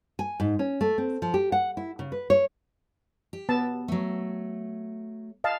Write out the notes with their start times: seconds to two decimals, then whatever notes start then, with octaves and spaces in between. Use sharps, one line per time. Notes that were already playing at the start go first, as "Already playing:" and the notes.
0.19 G#5
0.40 G#2
0.59 C#4
0.81 A3
0.98 C4
1.22 F3
1.34 G4
1.52 F#5
1.77 E4
1.99 C#3
2.12 B4
2.30 C#5
3.33 G4
3.49 B3 A5
3.88 F#3 A3
5.44 D#5 F5 A5